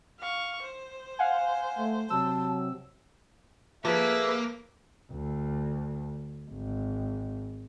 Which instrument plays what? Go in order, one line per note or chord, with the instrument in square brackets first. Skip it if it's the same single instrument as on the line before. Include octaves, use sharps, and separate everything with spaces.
[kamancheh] F5 C#6
C5
[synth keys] F5 F#5 G#5
[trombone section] A3
[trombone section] C3 F#3 [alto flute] A5 [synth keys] E6
[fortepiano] F3 [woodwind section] A3 G#4 E5 [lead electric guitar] A#3 [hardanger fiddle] B4
[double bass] D2
G#1